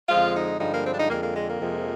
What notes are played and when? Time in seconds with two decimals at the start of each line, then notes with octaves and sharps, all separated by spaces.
0.09 F2 D3 F3 G#3 F4
0.34 D#4
0.59 G2 D3 F3 G#3 D#4
0.72 A#3
0.85 C4
0.93 D4
0.97 D#4
1.10 F2 D3 G#3 A#3
1.23 A#3
1.35 G#3
1.48 A#3
1.61 F2 C3 F3 G#3